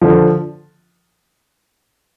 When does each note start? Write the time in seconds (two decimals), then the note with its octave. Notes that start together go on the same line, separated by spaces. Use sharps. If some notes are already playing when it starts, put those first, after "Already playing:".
0.01 D3 F3